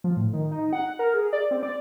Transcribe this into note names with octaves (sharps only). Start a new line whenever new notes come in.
F3
A2
D#3
D#4
F#5
A#4
G#4
D5
C4
D5